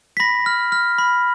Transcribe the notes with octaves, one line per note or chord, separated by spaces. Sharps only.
B6
B5 A#6
F6
F6
B5